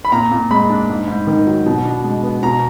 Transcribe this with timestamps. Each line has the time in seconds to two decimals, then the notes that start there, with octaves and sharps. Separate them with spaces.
0.05 B5
0.12 A#2 A#5
0.31 A#2
0.51 G#3 B5
0.70 D4
0.90 G#2
1.08 G#2
1.27 D#3
1.47 F#3
1.66 B2
1.85 D4
2.04 G#3
2.23 B3
2.43 B2 A#5